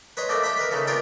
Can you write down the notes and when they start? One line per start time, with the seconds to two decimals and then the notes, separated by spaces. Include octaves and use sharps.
0.17 B4 C#5 D#5 A#5 C6
0.29 A3 A#3 C4 D4 D5 D#5
0.43 G4 E5 G5 B5
0.57 A#4 B4 D#5 B5
0.71 C#3 A3 A#3 D#4
0.87 B3 F4 A#4 D5 G5 C6